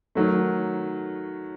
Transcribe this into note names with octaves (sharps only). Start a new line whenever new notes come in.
D#3 F#3 A3